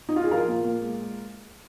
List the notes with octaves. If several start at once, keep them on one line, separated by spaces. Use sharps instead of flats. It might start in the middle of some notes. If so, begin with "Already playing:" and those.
D#4
F4
G#4
F3 F4 A#4
A#2
A#2
G#3